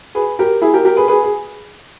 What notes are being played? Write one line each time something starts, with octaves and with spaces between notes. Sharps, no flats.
G#4 B4
G4 A#4
E4 G#4
G4 A#4
G4 A#4
G#4 B4
G#4 B4
G#4